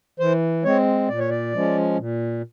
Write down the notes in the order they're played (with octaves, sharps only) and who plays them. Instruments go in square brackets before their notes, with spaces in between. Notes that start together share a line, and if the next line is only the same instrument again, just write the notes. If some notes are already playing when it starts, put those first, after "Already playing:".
[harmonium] E3 C5
G#3 C4 C#5
A#2 D5
C#5
D5
F3 G#3 C#4
A#2